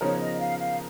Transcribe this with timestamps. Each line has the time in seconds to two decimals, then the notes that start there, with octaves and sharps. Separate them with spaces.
0.01 C#3 F3 B3 D#4 A#4 C#5
0.20 D#5
0.40 F5
0.59 F5